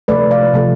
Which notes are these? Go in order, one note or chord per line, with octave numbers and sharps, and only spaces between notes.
C3 F3 A3 B4 D5
D5 F5
C3 F3 A3